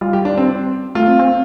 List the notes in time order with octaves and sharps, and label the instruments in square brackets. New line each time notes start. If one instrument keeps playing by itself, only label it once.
[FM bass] G3 [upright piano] F4
[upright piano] G4
D4
C4
[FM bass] A3 [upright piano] F4
[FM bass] C4
C4